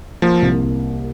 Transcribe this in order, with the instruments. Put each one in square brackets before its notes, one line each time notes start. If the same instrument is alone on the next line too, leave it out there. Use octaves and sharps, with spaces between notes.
[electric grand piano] F3 [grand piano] A#3
[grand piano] C2